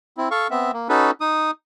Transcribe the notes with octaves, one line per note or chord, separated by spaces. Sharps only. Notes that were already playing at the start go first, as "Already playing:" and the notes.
C4 E4
A4 F5 C#6
B3 C4 E5
A#3
C#4 D#4 F#4 A4 B4
D#4 D#6